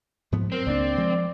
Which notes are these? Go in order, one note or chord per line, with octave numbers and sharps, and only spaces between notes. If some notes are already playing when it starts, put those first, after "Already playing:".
G#2 F3 B3
F#3 C4 A#4
C#2 A#3 D4 D5
F3 G#3